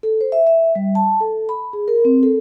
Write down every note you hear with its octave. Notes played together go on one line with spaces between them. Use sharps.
A4
C5
E5
E5
G3
A5
A4
B5
G#4
A#4
C4
A4